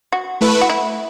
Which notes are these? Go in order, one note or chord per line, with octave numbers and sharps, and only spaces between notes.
F#4
A3 E4 B4
F#4
E4